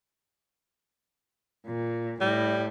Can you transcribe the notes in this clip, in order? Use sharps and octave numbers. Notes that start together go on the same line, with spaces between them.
A#2
A2 G3